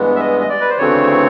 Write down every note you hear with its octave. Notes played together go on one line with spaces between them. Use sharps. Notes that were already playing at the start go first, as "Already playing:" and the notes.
Already playing: G2 E3 G#3 B3
E5
D#5
D#5
D5
B4
C5
D2 C#3 E3 A3 C4 C#5